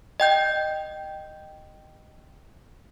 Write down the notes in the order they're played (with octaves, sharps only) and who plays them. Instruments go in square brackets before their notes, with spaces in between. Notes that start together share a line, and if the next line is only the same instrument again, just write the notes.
[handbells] D#5 G5 G6